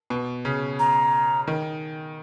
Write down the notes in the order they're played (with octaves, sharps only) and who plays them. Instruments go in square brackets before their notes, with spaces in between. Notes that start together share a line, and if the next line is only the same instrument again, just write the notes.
[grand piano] B2
C#3
[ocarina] A#5
[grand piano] D#3